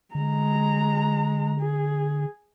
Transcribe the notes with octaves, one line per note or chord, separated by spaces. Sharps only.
D3 G#3 A#5
G#4